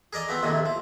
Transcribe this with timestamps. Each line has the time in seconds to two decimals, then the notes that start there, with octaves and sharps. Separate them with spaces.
0.13 G#4 A#4 D5 D#5
0.29 F3 B3 C4
0.43 A#1 D#2 A2 C3 D#3
0.66 F3